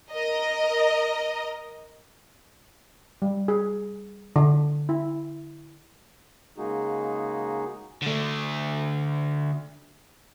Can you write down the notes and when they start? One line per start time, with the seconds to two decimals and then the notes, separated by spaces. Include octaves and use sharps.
0.14 A#4 D#5
3.22 G3
3.48 G#4
4.36 D3
4.89 E4
6.58 C#3 G#3 A#3 D#4 F#4 G#4
8.02 D3 A3